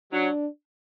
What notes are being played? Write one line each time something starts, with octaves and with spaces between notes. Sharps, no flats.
F#3 D4